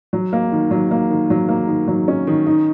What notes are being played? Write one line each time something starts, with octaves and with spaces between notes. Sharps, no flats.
F#3
A#3
D#3
F#3
A#3
D#3
F#3
A#3
D#3
F#3
C#4
D#3
D#4